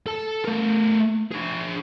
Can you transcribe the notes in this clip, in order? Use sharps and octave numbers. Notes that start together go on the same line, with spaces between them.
A4 A5
A3 A#4
D4 G#4